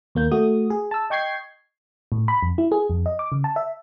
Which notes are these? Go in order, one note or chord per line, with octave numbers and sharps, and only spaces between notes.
D#2 A#3 G6
A3 F#4 D#6
G#4
A5 E6
D#5 G5 C#6 G6 G#6 C7
A2
B5
F2
E4
G#4
F2
D#5
D6
C#3
A5
E5